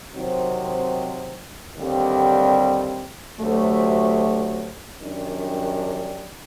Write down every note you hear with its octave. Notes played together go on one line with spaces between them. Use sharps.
C3 D#3 F#3 C4 D#4
D#2 D3 G3 C4
D2 C3 F#3 A3
F#2 D#3 G3 D4